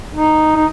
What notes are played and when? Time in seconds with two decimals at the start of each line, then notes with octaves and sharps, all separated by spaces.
0.13 D#4
0.56 D#4